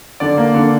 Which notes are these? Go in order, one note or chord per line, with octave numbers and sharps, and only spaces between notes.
D3 D5
A#3
D3